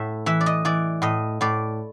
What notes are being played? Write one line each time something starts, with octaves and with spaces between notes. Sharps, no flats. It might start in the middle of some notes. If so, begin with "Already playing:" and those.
Already playing: A2 E5
E3 E5
D5
D#5
E3 D5
A2 D#5
A2 D5